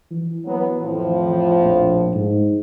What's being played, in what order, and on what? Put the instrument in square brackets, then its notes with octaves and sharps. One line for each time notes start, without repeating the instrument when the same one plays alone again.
[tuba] E3
[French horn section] F#3 B3
F2 A2 F3
[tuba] A#1
G#2